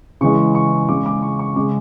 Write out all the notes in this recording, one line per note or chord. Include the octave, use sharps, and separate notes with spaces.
C#3 E3 G#3 C#6
C#6
C#3 G#3 D6
D6
C#6
C#6
C#3 G#3 D6